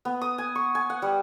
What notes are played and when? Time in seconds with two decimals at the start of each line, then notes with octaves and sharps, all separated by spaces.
0.05 B3
0.21 D#6
0.38 G#5
0.55 C#6
0.75 G#5
0.90 F#5
1.02 G3